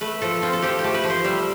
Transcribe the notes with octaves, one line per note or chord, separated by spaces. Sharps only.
A3 B4
F3 A4
C4 F4
A4
F3 G4
G4
A3
B4
F3
C5
G3 E5